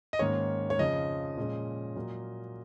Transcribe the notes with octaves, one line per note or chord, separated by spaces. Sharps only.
D#5
G#2 D#3 A#3 C#4 C#5
C#5
F2 C#3 F3 D#5
A#2 G#3 C#4
A#2 F#3 A#3